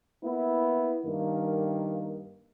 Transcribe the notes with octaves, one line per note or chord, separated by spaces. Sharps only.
A#3 B3 E4
G2 D#3 A#3